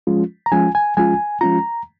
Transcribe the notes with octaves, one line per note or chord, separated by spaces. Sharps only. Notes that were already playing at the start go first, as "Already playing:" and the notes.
F3 G#3 C#4 F4
A#5
F3 G#3 C#4 F4 G#5
G#5
F3 G#3 C#4 F4 G#5
F3 G#3 C#4 F4 A#5